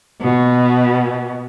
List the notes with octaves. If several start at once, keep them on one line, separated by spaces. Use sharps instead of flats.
B2